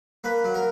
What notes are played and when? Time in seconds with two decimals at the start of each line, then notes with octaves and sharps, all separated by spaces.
0.24 A#3 B4
0.44 F#3
0.54 A#4